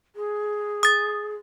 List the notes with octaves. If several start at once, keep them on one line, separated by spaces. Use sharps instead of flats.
G#4
D#6 A6